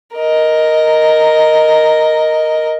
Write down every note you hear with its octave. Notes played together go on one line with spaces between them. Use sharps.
A#4 D#5